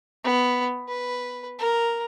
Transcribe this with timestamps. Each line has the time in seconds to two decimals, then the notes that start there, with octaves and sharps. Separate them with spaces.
0.24 B3
0.88 B4
1.59 A#4